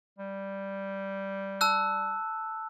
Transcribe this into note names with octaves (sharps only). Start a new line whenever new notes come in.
G3
A5 E6 F#6